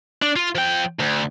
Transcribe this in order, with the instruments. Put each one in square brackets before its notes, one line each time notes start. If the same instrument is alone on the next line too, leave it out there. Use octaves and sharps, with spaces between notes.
[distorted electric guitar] D4
F4
F3 G5
D2